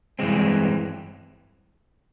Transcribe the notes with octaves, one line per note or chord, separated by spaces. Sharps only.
G2 E3 G#3 C4